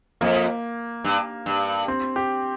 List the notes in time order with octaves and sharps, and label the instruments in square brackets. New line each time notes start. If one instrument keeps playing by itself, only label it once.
[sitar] F2 [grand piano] A#3
[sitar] G2
G2
[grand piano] C4
G4